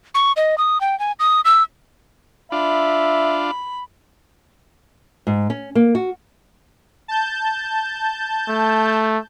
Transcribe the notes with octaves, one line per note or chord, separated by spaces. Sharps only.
C#6
D#5
D#6
G5
G#5
D#6
E6
D4 F4 E5 B5
G#2
C#4
A#3
F#4
A5 G6
A3